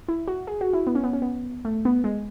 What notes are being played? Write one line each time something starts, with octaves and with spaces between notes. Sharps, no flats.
E4
F#4
G#4
F#4
E4
B3
C#4
B3
C#4
B3
A3
B3
G#3